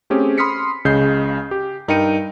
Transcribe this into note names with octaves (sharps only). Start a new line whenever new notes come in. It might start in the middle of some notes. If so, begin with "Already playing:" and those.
A3 C4 C#4 G4 G#4
B5 C6 D#6 F6 B6 C#7
C#2 C#3 D#5 G6 C7
G4
G2 D#4 A#4 G5 C#7 D#7